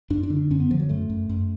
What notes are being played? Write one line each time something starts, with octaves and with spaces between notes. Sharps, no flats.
F#2 D4
D4
D3
D4
F#2 C#4
B3
D3 F3
F#3
F#2 A3
F#2
F#2